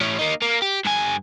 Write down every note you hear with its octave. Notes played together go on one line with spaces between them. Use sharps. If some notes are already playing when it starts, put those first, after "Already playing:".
A2 C#4
A#3 D#4
A#3
G4
G2 G#5